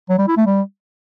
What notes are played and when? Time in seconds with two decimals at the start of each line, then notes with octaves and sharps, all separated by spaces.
0.09 F#3
0.19 G3
0.28 E4
0.37 A3
0.46 G3